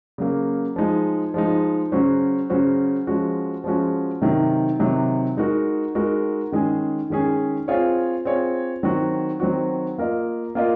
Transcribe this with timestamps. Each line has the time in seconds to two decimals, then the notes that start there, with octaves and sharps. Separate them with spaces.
0.18 C#3 F#3 A#3
0.76 F3 G#3 D#4
1.34 F3 G#3 D#4
1.92 C#3 F#3 C#4 F#4 C5
2.50 C#3 F#3 C#4 F#4 C5
3.07 F3 G#3 C#4 F#4
3.64 F3 G#3 C#4 F#4
4.21 C3 D#3 F#3
4.79 C3 D#3 F#3
5.37 G#3 D#4 F#4 A#4
5.95 G#3 D#4 F#4 A#4
6.52 D#3 G#3 C#4 G#4
7.10 D#3 G#3 C#4 G#4
7.68 C4 F4 G#4 C#5
8.25 C4 F4 G#4 C#5
8.83 D#3 F#3 C4 F#4
9.40 D#3 F#3 C4 F#4
9.98 A#3 F4 A#4 D#5
10.55 A#3 F4 A#4 D#5